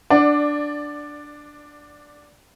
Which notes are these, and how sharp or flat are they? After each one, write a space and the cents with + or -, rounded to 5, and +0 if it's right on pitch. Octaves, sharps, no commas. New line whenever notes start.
D4 +0 D5 +15 F#5 +0